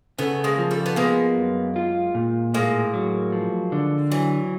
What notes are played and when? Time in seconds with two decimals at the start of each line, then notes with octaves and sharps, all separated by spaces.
0.19 C#3 A3 B3
0.44 G#3 A#3
0.58 F3
0.71 G3 A3
0.86 B3
0.96 G#3 A#3 B3
1.36 F#2
1.76 F4
2.15 A#2
2.54 A2 G#3 A#3
2.94 F#3
3.32 F3
3.72 D3
4.10 E3 F#3